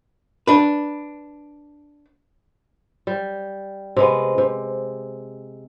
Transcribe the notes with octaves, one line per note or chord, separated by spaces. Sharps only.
D4 B4
G3
C3 G#3 B3
C3